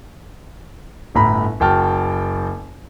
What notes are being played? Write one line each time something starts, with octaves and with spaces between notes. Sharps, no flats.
G1 A2 A#5 B5
F#1 F#4 G5 A5 F6